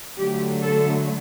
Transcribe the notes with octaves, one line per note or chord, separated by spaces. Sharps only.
D3 F#3 A3 G4
A4